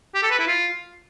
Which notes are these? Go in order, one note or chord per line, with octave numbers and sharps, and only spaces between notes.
G4
A4
B4
E4
F4